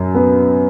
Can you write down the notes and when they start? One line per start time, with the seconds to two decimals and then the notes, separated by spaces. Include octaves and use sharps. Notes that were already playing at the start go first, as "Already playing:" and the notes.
Already playing: F#2 F#3
0.15 B3